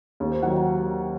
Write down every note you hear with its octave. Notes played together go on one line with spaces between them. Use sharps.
D#2
C5
D#3 F#3 F#5